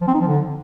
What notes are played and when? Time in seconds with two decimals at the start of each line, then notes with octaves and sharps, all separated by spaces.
0.01 F3
0.08 C4
0.14 D#4
0.21 F3
0.27 D3